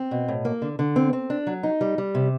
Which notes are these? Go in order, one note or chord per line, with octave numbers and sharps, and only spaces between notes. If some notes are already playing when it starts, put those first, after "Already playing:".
Already playing: C4
B2
A2
A#3
D3
D3
C4
C4
D4
F#3
D#4
G3
G3
C3